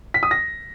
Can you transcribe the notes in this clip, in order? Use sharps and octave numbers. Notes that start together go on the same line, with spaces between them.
B6
D#6
A#6